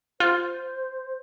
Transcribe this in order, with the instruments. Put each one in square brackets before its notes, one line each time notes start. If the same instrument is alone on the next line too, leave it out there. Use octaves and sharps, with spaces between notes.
[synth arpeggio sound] F4 [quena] C5